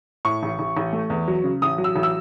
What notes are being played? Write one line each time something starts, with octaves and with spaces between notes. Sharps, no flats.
A2 C#6
A1
A1
A1
A3
E2
F#3
C#3
A1 D#6
F#3
E6
A1
E6